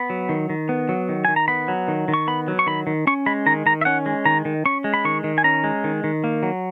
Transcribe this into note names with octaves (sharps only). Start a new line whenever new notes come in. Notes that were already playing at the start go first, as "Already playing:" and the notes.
Already playing: B3 B5
F#3
D#3
D#3
B3
F#3
D#3
D#3 G#5
A#5
B3 B5
F#3
D#3
D#3
C#6
B3 B5
F#3
C#6
D#3 B5
D#3
C#4 C#6
G#3 B5
D#3 A#5
D#3 A#5
E5
C#4 F#5
G#3
D#3 A#5
D#3
C#4 C#6
G#3
B5
D#3 C#6
D#3
G#5
C#4 A#5
G#3
D#3
D#3
A#3
F#3